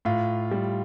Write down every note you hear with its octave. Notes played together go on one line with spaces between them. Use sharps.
A2 F4
G3